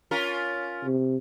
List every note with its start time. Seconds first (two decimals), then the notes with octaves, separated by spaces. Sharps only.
0.11 C#4 F4 A#4
0.84 C3